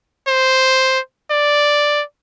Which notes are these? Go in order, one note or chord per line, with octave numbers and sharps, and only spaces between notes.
C5
D5